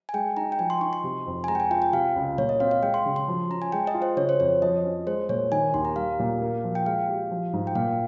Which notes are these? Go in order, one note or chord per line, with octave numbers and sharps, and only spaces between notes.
G#5
G#3 G5
D#4 A#5
G5
F3 G#5
C6
D#4 C#6
C6
C3
F2
G#5
G#3 A#5
G5
G#5
F4 G5
G5
C3 F5
C#2
A#2 C#5
D#5
C4 F5
F5
G#3 G5
C6
C#3
C6
F3
C#4 A#5
G#5
G#3 G5
D#5
F4
C5
C#3 C#5
C5
F2 C#5
F3 D#5
C#4
G#3 C5
A#2 C#5
D#3 G#5
D#2 C6
A#5
G3 F5
A#2
A#3
F3
G5
G#3 F5
G4
F3
G#2
G5
A#2 F5